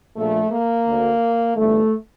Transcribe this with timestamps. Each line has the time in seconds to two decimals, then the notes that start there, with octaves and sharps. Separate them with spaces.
0.16 A#1 A#2 A3
0.51 A#3
0.86 D2 D3
1.56 G1 G2 E3 A3